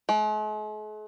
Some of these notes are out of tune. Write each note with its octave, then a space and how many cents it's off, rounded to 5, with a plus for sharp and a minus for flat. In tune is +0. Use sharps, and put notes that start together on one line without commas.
G#3 +45